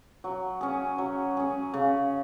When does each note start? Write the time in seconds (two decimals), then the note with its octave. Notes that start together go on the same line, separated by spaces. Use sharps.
0.24 F#3
0.61 C#4 G#4
0.98 F#3
1.37 C#4 G#4
1.74 C#3